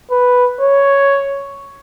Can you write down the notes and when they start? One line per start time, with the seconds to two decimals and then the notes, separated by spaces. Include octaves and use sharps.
0.11 B4
0.61 C#5